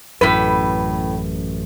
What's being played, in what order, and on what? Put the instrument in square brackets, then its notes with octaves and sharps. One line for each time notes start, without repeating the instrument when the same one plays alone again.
[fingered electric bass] A1 F#2 [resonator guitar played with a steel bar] A2 B4